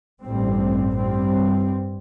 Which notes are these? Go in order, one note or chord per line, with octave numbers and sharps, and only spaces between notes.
A1 G2 G3 C4
G2 G3 C4